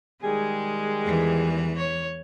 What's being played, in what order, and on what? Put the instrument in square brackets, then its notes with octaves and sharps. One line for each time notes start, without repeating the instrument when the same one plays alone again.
[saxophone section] D#3 G3 G#4 [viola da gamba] G#3
[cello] E2 E3
[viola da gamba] C#5